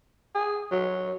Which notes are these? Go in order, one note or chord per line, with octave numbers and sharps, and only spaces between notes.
G#4
F#3